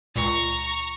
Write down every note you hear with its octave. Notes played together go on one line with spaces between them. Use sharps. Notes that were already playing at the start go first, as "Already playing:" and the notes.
C#2 A#2 A#5 C#6